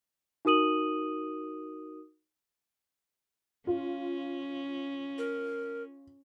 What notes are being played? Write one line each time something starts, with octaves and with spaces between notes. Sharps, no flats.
D#4 F#4 A#4 D#6 D#7 F#7
C#4 F4
A#4